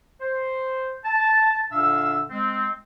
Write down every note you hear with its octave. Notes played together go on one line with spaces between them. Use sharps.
C5
A5
A#2 D3 D4 E5 F5 E6
G#3 C4